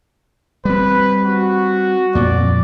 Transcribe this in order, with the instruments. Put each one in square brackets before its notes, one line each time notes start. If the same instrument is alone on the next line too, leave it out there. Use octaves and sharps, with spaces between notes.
[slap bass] G3 C4 [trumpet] B4
[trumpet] F#4
[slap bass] F2 A#2 [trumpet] D5